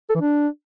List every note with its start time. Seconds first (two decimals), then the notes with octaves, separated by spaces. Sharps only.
0.10 A4
0.15 E3
0.21 D4